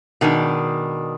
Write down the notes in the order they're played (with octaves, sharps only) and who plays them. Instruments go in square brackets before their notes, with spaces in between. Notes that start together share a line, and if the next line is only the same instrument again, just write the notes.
[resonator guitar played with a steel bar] B2 D#3 G#3 D4